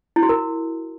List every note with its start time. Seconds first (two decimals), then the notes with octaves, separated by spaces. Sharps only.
0.16 E4
0.23 F#4
0.29 A#4